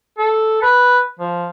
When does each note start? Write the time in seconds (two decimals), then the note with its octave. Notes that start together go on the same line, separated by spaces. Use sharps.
0.18 A4
0.62 B4
1.19 F3